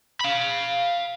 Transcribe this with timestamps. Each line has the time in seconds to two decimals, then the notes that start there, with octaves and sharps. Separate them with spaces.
0.21 F5 B5